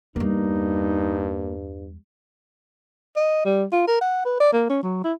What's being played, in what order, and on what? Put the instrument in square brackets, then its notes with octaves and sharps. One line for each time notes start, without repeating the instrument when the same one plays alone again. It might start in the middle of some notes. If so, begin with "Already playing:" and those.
[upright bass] E2 G3 [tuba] G2 [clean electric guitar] A#3 [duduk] D#4
[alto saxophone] D#5
G3
F4
A#4
F#5
B4
D5
A#3
C#4
F#3
E4